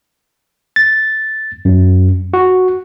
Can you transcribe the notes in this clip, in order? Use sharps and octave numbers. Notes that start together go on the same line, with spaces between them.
A6
F#2
F#4